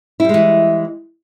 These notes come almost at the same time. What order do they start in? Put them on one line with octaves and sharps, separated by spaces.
E4 G3 G#3 E3